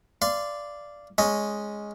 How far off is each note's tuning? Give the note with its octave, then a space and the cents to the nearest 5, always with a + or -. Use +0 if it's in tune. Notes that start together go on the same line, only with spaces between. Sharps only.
D5 +0 F5 -25 C6 -15
G#3 +0 C#4 +0 D#5 +0